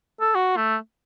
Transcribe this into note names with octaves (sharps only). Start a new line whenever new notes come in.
A4
F#4
A3